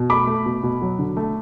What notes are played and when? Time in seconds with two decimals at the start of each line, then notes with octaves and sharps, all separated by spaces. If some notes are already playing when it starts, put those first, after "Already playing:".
Already playing: B2
0.10 A3 B5 D6
0.27 A3
0.46 B2
0.63 B2
0.82 F#3
0.99 D3
1.17 A3